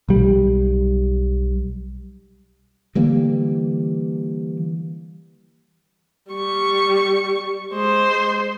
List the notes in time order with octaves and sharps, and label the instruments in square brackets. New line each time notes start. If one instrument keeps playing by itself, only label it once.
[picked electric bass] B1 G3
[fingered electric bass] D3 E3 G3 A#3
[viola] G3 C#6
G#3 C5